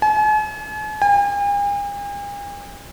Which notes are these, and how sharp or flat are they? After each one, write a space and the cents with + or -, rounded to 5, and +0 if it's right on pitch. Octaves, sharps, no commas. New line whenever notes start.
G#5 +45
G#5 -45